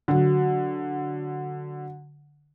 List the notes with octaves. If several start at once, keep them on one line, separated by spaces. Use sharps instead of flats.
D3 F#3